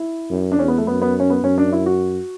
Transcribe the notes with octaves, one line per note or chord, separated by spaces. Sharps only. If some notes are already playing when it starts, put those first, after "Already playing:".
Already playing: E4
F#2
D4
E2 C#4
B3
A3
F#2 B3
B3
C#4
B3
F#2 C#4
D4
E4
F#4